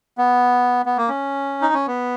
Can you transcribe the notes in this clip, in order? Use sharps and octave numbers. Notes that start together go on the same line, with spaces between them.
B3
B3
A#3
C#4
D#4
C#4
B3